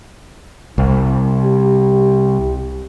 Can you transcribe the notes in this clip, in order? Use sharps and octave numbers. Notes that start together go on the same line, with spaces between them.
C2
G4